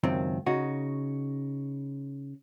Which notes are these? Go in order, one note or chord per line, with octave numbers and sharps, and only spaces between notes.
C#2 F#2 D#3 C4
C#3 D#4 F#4